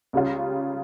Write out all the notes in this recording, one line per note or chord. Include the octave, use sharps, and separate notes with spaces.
C#2 C#3 G3 C#4 F4